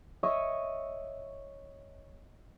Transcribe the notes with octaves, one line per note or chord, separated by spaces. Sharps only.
C#5 D#5 E5 C#6